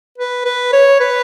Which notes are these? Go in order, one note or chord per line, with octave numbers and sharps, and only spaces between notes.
B4
B4
C#5
B4